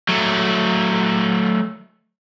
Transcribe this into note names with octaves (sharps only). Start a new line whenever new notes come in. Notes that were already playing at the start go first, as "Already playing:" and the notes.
F#3 A3